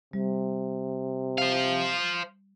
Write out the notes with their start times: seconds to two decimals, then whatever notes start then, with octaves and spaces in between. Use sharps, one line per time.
0.13 C3 G3
1.38 C5 F5